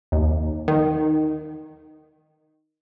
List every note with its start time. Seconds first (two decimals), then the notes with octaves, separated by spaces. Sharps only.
0.12 D#2
0.68 D#3